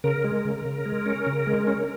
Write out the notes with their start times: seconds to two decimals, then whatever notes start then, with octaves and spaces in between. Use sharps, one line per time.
0.04 C#3 A#4
0.24 G#3
0.45 C#3
0.65 C#3
0.86 G#3
1.06 C#4
1.27 C#3
1.47 G#3
1.67 C#4